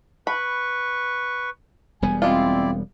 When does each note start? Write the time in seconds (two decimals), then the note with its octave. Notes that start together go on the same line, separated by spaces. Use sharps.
0.27 B4 B5 C#6
2.02 E1 G3 B3 G#5
2.22 G#3 C4 E4 F4 D5